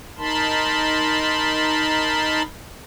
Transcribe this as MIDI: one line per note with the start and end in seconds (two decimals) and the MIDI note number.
0.18 2.42 63
0.18 2.42 70
0.18 2.42 81
0.18 2.42 83
0.18 2.42 84